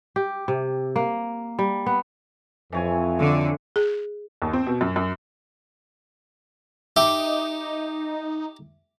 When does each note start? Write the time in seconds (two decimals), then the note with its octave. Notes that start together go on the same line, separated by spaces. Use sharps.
0.16 G4
0.48 C3
0.96 A#3
1.59 G3
1.86 B3
2.72 F2 E3 C#5 G#5
3.19 D3
3.76 G#4
4.42 D#2
4.53 C4
4.66 B2
4.81 F#2
4.96 F#2
6.96 D#4 G4 E5 D6